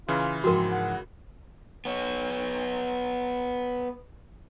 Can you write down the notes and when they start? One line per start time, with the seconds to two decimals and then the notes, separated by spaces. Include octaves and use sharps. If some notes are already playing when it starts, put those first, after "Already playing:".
0.08 C#3 E3 F4
0.44 G#2 F3 C4 F#4 A#4
0.71 F#5
1.85 B3 C#5